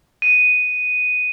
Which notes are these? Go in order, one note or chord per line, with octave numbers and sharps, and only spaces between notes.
D#7